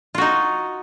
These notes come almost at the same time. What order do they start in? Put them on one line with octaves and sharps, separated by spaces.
F4 F#4 D#4